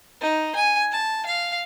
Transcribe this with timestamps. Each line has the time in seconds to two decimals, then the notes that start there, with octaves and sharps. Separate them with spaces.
0.21 D#4
0.55 G#5
0.92 A5
1.26 F5